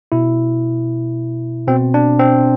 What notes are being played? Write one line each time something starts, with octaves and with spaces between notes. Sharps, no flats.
B2 E4
B2 C4
D4
C4